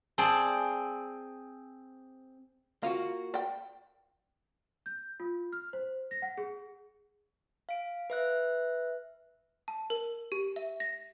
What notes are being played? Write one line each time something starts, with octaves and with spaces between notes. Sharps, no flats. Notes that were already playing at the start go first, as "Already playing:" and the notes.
C4 G#4 D5 G#5 A5
A#3 F4 F#4 F5
D5 G5
G6
F4
F6
C5
A#6
F#5
G#4
F5 D7
B4 E5 F#6
A5
A#4
G4
E5
A#6